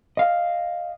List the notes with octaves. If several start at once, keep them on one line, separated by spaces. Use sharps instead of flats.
D#5 F5